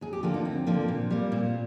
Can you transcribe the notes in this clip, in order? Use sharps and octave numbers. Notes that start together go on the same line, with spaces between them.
D#2 G#4
G4
D3 F3 A#3 F4
D#4
D#2 C4
D3 F3 A#3
A#2
G3 A#3
A#2